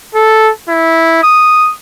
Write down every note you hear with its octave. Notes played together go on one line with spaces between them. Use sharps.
A4
E4
D#6